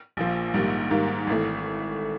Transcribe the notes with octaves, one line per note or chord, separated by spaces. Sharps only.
A#1 A#2 F3
A#1 G#2 D#3 G3 A#3
G#2 D#3 G3 A#3
G#1 E3 A3